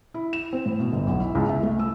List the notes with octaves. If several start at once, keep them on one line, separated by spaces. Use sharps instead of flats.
E4
E7
C4
A2
B2
G1
B1
E4
C#2
E5
A3
E6